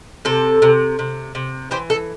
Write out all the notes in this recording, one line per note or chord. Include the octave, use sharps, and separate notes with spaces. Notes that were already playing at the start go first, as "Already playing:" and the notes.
C3 A4
C3
C3
C3
E3 G4 C5
A4